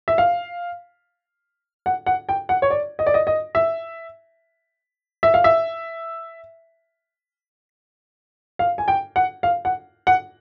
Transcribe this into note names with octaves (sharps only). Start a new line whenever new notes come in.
E5
F5
F#5
F#5
G5
F#5
C#5
D5
D#5
D5
D#5
D#5
E5
E5
F5
E5
F5
G#5
G5
F#5
F5
F#5
F#5